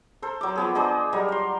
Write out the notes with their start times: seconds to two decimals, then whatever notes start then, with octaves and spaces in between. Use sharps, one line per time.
0.22 A4 A#4 C5
0.41 F#3 D6
0.56 F3 B3 G#4
0.75 D4 G#4 C5 D#5
1.13 F#3 G3 A#4 D#5
1.29 D5 C6